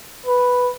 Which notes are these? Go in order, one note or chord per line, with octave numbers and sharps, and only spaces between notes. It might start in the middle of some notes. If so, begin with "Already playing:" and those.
B4